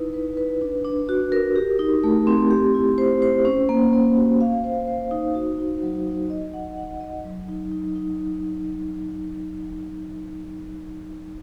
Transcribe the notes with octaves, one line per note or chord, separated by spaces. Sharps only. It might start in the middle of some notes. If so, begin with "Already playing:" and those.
Already playing: D#4 E4 B4
B4
B4
D4
D4
F#4
A#4
G4
D#4
A3
C4
G4
E4
C5
C5
C#4
A#3
A#3
F#4
F5
C5
C5
D#4
F#4
D#4
F#3
D#4
D#5
F#5
F#5
D#5
F#3
D#4
D#4
D#4